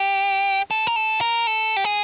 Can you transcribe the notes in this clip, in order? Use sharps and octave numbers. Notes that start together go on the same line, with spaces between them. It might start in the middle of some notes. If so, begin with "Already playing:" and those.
Already playing: G4
A4
A#4
A4
A#4
A4
G4
G#4